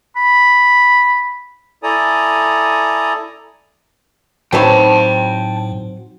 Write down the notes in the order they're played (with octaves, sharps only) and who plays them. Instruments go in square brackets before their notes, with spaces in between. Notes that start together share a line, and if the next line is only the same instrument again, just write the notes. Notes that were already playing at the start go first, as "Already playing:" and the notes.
[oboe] B5
[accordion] E4 A4 D5 G#5 A#5 D#6
[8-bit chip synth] A2 [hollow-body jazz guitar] F#3 B4 C#5 [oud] C4 D#4 [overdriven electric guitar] G5 A5